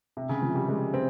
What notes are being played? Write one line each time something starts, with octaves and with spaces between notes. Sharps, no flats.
C3
C#3
F3
G3
G#3
C4